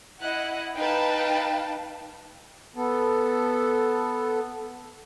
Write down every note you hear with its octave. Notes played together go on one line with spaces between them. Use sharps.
E4 D#5 F#5 F#6
D#4 B4 F5 G5 A5
B3 A4